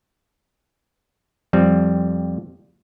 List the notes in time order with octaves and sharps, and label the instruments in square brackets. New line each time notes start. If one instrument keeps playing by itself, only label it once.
[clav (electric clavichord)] F2 G3 C4